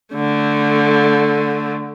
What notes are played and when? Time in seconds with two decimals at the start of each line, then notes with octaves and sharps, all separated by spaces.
0.15 D3 A3